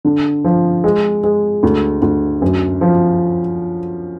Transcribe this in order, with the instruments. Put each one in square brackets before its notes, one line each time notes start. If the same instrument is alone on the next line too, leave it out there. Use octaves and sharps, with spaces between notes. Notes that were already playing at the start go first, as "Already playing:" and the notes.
[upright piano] D3
F3
G#3
G#3
D2
D2
F#2
F3